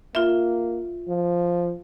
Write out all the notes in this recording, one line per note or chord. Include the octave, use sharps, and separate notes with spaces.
A#3 F4 E5
F3